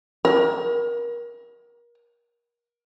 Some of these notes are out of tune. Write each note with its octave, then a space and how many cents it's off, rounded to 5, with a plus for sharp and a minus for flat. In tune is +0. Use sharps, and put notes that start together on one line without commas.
A#4 +30